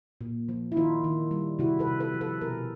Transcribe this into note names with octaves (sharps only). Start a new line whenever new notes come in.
A#2
F3
E4
D#3 D#4 F4
D#3
G3
C3 E4 F#4
A4 B4
C3
A4 B4
F3
A4 B4
B2 G#4 A#4